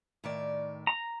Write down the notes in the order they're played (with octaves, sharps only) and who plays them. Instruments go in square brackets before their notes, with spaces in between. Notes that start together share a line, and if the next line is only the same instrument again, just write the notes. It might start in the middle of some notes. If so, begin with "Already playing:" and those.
[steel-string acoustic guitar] A2 D#3 D5
[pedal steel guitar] A#5